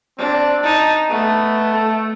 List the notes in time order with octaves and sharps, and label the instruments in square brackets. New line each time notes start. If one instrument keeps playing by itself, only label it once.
[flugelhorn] C4 [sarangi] D4
[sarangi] D#4 [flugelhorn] A5
[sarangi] A3 [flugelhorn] B3
[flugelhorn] A4